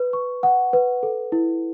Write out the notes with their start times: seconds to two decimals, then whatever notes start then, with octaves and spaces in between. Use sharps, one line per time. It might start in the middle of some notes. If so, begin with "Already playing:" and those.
Already playing: B4
0.13 C#6
0.43 F#5
0.73 B4
1.03 A4
1.32 E4